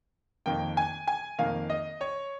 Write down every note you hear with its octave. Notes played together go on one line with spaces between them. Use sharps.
F2 D#3 A#3 G5
G#5
G#5
F2 D#3 A#3 F5
D#5
C#5